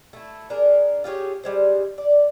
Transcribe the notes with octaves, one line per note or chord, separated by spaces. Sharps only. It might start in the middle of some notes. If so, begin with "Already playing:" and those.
A3 E4
D4 G#4 A#4
F4 G4 G#4 C#5
G3 G#3 C5
D5